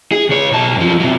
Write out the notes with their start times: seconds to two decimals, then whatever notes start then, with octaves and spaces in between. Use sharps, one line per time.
0.12 G#4
0.29 C#2 C#5
0.51 B1 A5
0.76 F#2 F3
1.00 C3 F#3